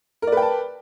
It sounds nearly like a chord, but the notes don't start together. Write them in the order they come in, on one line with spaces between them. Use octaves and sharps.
A#4 D5 B4 G5 A5